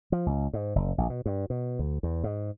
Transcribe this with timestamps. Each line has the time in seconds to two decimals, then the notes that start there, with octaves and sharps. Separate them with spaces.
0.12 F3
0.26 C#2
0.53 G#2
0.76 F#1
0.98 A#1
1.10 B2
1.26 G2
1.50 B2
1.79 D2
2.03 E2
2.24 G#2